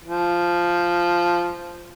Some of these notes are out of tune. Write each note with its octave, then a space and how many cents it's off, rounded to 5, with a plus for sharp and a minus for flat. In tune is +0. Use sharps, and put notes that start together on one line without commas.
F3 -5